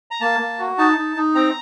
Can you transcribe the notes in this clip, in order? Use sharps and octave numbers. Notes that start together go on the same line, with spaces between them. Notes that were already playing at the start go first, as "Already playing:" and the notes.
A#5
A#3 A5
A#3
F#4
D#4 A5
D#4
D#4
C4 A#5